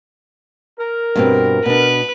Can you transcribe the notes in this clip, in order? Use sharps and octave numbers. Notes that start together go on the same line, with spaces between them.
A#4
G2 B2 C4
B2 D4 B4